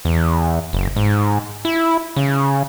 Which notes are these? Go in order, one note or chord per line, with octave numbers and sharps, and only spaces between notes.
E2
F#1
G#2
E4
C#3